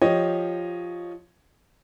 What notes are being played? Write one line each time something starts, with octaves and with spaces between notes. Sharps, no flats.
F3 G4 C#5 D#5